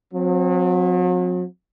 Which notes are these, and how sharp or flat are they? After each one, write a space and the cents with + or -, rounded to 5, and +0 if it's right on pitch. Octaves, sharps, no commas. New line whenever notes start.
F#3 -40 C4 +0